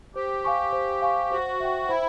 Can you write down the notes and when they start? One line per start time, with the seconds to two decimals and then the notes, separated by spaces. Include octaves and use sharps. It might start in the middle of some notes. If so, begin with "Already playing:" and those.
0.15 G4 C5
0.44 F5 G#5 C#6
0.73 C5
1.02 F5 G#5 C#6
1.31 F#4 C5
1.60 E5 G5
1.89 E4 C5